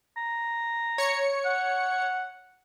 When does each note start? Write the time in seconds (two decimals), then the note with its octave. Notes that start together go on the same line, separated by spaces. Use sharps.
0.17 A#5
0.98 C#5 C#7
1.45 F#5